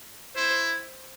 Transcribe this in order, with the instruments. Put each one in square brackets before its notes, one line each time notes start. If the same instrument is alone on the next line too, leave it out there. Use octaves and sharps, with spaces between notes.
[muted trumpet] E4 [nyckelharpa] C5